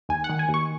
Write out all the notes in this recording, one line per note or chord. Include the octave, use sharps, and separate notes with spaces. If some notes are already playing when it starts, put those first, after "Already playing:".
D#2 G#5
F#5
D#3
G#5
D#2
C#6